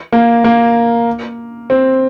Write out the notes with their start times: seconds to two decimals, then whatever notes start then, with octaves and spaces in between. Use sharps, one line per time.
0.13 A#3
0.44 A#3
1.70 C4